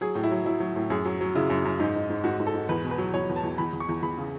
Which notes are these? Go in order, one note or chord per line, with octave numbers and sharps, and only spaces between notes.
F#3 G#4
A2
E4
F#3
F#3 E4
F#3
A2
F#2 G#4
F#3
F#3
C#3 E4
F#2
F#2
G#2 D#4
G#2
G#2
G#2 F#4
G#2
A4
G#2
E2 B4
B2
B4
F#3
E2 C#5
E2
A5
E2
E2 B5
E2
C#6
E2
E2 B5
C#3